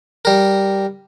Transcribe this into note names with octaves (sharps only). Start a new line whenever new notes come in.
G3 A#4